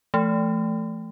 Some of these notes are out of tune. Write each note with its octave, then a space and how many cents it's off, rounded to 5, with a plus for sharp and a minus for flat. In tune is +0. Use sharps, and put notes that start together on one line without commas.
F3 -45 A3 +0